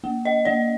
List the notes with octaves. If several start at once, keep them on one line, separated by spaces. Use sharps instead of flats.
A#3
D#5
A#3 D5